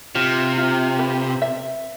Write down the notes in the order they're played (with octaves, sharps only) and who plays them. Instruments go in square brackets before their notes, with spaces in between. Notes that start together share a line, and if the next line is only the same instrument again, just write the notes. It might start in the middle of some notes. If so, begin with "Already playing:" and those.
[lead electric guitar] C3 [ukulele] F4
[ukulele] F4
B4
E5